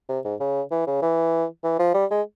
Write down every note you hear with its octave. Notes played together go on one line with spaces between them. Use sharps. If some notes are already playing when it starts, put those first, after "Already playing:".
C3
G#2
C#3
E3
C#3
E3
E3
F3
G3
G#3